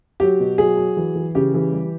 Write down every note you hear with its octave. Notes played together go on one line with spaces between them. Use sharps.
F#3 G4
B2
F#3 G#4
F#3
E3
E3
C#3 G4
E3
G3